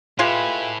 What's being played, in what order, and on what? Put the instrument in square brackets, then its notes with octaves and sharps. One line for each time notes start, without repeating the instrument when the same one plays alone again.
[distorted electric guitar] A2 [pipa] G#3 F4 G4 [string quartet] B4 E5 G#5